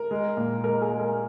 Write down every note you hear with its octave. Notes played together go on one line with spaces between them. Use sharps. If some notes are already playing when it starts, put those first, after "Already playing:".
Already playing: A#4
G#3
A#2
G#3 A#4
G#4
G#3
A#4